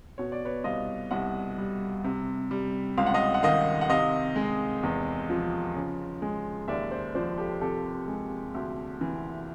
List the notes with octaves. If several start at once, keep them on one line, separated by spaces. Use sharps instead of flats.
B2 C#5
D5
B4 C#5
C2 D#5 F5
C2 E5 F#5
G3
C3
G3
C#2 F5
F#5
D#5 F5
F#5
D#3 D#5 F5
F#5
C3 D#5 F5
G#3
E2
F3
C#3
G#3
D#2 D5 E5
C5 D5
F3 C5 D5
G4 A4
C3 G4 A4
G#3
D2
E3